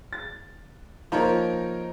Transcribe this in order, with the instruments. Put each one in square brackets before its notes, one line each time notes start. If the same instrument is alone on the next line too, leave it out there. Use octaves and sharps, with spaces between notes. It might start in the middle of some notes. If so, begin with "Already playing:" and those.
[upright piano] A6
[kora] F3 [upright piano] A#3 C5 [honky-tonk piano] D#4 A#4 C#5